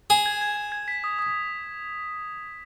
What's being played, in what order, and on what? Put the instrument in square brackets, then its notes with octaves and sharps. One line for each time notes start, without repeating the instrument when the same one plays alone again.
[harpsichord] G#4 [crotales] E7
[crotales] G#6
G#6
G#6
G#6
B6
D#6
D#6